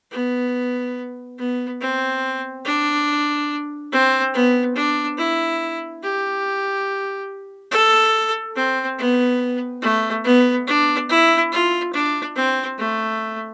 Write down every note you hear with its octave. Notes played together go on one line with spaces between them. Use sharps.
B3
B3
C4
D4
C4
B3
D4
E4
G4
A4
C4
B3
A3
B3
D4
E4
F4
D4
C4
A3